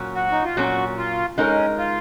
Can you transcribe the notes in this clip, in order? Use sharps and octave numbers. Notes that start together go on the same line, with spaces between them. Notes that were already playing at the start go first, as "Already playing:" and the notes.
Already playing: A#2 F#3 C#4
F#4
D#4
F4
A#2 F#3 C#4 F#4
F4
G#3 C#4 D#4 A#4
F4